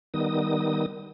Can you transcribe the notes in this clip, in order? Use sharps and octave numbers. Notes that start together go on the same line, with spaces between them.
D#3 G3 B3 D#4 D#6